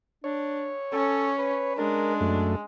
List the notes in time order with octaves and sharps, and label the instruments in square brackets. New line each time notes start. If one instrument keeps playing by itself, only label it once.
[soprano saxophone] D4 [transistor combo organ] C#5
[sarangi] C#4 [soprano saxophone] A4
[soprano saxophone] B4
[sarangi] G#3 [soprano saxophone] D4 [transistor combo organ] A#4
[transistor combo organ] F#2 A3